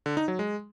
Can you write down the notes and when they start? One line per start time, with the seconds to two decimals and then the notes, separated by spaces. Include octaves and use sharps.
0.06 D3
0.17 D#4
0.28 F#3
0.39 G#3